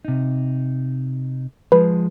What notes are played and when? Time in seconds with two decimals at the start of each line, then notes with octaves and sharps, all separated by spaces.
0.05 C3 D#4
1.72 F3 G#3 B4